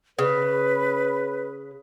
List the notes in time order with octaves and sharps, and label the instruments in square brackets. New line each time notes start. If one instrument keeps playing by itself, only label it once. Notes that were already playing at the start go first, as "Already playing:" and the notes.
[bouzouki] C#3 [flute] B4